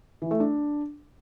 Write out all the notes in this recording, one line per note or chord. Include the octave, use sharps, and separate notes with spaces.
E3
A3
D4